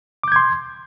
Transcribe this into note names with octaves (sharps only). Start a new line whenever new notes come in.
C6 D6 G6 G#6